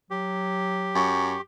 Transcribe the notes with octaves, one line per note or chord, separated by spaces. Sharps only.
F#3 G4
F#2 C#6